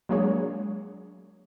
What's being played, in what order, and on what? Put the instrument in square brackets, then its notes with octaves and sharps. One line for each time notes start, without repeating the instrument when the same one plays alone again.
[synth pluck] F#3 G#3 A#3 D4 G#4 C#5